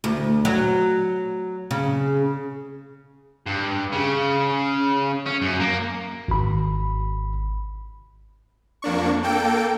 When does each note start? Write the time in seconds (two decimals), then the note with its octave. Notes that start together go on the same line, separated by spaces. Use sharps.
0.04 D2
0.45 F#3
1.71 C#3
3.46 G2
3.92 C#3
5.26 C#4
5.42 F#2
5.60 A#3
6.28 G#1 B5
8.82 F2 A#3 D4 C#6
9.23 A#3 A4 G5 D7